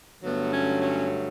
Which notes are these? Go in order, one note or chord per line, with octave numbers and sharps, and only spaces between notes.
G2 D3 F#3 A3 B3
C#4
C#4